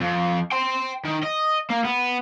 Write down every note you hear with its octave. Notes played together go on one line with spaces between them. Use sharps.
F2
G5 C6
D#3
D#5
A#3
B3